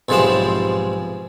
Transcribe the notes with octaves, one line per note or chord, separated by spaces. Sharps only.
B1 G#2 C3 F3 G#3 A5